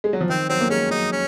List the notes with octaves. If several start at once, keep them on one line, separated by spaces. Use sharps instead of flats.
G#3
F#3
F3
D#3 C4
F#3 C4
A#3
G#3 C#4
F#3 D#4
C#4